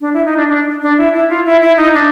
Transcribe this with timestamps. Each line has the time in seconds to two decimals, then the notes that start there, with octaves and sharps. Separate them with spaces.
0.01 D4
0.14 E4
0.26 D#4
0.37 D4
0.49 D4
0.82 D4
0.98 E4
1.13 E4
1.29 F4
1.46 E4
1.62 E4
1.77 D#4
1.94 D4